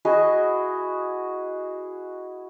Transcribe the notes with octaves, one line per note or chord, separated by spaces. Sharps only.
E4 F#4 G#4 D#5